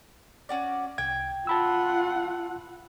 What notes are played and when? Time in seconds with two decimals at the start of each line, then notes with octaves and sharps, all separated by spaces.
0.49 C#4 F#4 D5
0.98 C2 G5 G#6
1.47 F4 F#5 A5 B5 E6